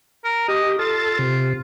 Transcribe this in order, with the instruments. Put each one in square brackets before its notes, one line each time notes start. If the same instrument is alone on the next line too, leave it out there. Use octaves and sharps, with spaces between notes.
[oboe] A#4
[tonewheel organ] G4 [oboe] D#5
[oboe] F4 [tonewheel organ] A4 A6
[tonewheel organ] C3